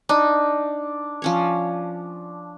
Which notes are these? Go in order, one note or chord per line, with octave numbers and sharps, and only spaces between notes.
D4 D#4
F3 C#4 C#5